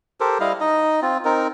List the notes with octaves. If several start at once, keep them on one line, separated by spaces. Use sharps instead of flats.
G4 A4 A#4 C5
G3 E4 D#5 F5
D#4 D#5
C4 F4
C4 D#4 A#4